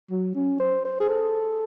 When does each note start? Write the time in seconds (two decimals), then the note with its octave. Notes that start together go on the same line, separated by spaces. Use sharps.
0.10 F#3
0.35 C#4
0.59 C5
0.85 C5
1.00 G#4
1.09 A4